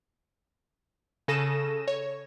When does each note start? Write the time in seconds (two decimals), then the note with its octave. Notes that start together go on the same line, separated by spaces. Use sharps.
1.28 C#3 A4 A#6 D#7 E7
1.88 C#5